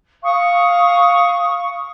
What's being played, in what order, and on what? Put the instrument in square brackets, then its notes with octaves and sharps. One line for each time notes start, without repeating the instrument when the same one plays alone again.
[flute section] F5 C#6 D#6